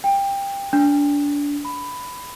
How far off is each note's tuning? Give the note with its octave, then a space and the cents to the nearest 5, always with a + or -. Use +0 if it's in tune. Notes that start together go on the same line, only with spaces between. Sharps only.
G5 +20
D4 -25
B5 +10